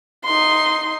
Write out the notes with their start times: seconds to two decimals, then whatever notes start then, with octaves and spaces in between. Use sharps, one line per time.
0.25 D#4 C6